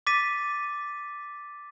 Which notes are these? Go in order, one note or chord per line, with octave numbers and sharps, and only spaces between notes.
D6 A6 B6 D#7